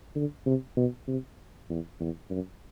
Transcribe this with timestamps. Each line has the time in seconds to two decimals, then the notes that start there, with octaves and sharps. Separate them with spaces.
0.15 D3
0.46 C3
0.77 B2
1.07 C3
1.69 E2
2.00 E2
2.31 F#2